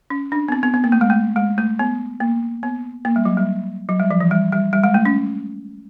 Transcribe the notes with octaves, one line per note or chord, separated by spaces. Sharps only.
C#4
D4
B3
C4
B3
B3
A#3
A3
G#3
A3
G#3
A3
B3
A#3
B3
A#3
G3
F#3
G3
F#3
G3
F3
E3
G3
G3
G3
G#3
A3
C#4